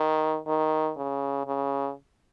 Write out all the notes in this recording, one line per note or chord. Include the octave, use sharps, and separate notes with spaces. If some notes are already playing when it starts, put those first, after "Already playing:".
Already playing: D#3
D#3
C#3
C#3